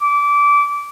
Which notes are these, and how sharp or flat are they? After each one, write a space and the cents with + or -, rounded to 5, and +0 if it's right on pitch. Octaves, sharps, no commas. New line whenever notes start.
D6 -20